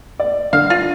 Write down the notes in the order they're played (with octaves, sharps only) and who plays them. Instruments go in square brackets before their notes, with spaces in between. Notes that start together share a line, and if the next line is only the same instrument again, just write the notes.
[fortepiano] D5
[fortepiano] D3 [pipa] F5
[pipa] F4